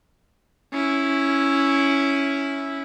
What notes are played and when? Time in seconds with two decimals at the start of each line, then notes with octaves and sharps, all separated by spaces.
0.73 C#4 E4